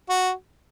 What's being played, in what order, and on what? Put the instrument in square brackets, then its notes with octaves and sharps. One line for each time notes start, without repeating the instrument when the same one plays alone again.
[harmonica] F#4